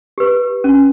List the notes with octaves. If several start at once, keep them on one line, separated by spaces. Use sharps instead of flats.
G4 B4
C#4